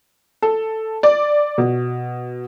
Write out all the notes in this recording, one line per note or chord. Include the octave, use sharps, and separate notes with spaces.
A4
D5
B2